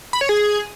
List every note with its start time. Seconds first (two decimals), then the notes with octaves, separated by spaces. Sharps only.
0.13 B5
0.21 C#5
0.29 G#4